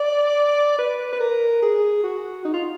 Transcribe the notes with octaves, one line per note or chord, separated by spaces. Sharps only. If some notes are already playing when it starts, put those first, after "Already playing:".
Already playing: D5
B4
B4
A#4
G#4
F#4
D#4
F4